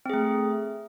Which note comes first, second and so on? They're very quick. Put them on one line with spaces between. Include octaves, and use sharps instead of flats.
C4 G#4 A3